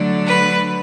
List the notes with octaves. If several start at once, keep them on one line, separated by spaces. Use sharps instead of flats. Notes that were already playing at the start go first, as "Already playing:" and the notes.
Already playing: D3 F#3 A3 D4
B4